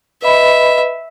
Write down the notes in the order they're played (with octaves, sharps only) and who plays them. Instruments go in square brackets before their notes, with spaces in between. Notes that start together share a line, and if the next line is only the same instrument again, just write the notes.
[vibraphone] B4 D#5 B5 [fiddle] E5